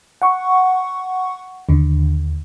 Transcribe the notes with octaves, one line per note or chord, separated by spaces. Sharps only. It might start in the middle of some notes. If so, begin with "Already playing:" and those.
F#5 C#6
D#2 D3